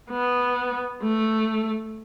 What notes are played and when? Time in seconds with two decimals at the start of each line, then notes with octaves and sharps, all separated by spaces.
0.11 B3
1.02 A3